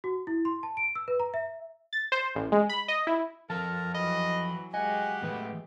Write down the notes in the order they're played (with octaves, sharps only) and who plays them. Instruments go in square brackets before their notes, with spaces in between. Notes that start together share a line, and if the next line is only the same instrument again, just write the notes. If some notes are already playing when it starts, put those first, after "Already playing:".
[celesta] F#4
E4
C6
A5
D7
E6
B4
A#5
E5
[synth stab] A6
C5
A1
G#3
B5
D#5
E4
[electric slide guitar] F3 A4 [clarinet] A#4 [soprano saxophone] A5
[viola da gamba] E3 F#3 [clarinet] D#5 [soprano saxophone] B5
[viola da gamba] F#3 G#3 G4 [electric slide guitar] D#5 [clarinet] F#5 [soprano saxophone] G#5
[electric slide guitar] A2 E3 A3 [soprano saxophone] B3